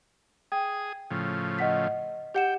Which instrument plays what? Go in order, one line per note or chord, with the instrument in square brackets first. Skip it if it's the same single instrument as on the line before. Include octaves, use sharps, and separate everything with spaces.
[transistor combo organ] G#4 D#6 [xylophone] G5
[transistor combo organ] A2 C#3 F3
[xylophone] D#5 F#5 B6
[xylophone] G4 F#5 E7 [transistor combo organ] G5